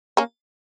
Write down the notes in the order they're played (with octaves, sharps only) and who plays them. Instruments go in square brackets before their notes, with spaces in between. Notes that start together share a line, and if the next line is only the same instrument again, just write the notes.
[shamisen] A#3 C#4